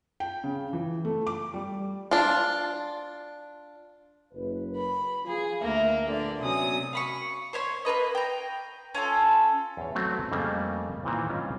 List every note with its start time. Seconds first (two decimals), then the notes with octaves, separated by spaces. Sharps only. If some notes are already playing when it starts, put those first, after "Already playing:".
0.20 G5
0.44 C#3
0.73 E3
1.05 A3
1.27 D6
1.54 G3
2.11 D4 F4
4.33 F#1 B4
4.75 B5
5.25 F3 F4 G#4
5.62 D2 A#3 A#4 E5
6.06 A#1 D3 A3 B4 D5
6.40 C3 F#3 B3 C#4 G#5 D#6
6.93 F5 B5 C#6
7.53 C5 C#5 E5 C6
7.85 A#3 F4 B4 D#5
8.15 G5 A#5
8.95 C#4 F4 A4
9.77 E2 C#5
9.95 F#3 A3 C4 F#4
10.31 F2 C#3 G3 A3 A#3
11.04 A#2 D#3 E3 C4
11.29 G3 C#4 F4 D#5 F5